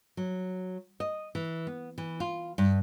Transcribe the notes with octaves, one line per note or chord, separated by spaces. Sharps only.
F#3
D#5
E3
B3
E3
F4
G2